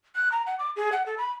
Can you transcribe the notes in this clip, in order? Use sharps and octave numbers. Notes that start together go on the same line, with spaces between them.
F#6
A#5
F#5
D6
G#4
F#5
A4
B5